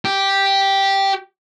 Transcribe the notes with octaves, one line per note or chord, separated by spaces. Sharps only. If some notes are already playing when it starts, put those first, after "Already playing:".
G4